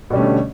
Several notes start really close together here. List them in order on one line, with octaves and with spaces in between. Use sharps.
B2 G3 C#4 A3 D3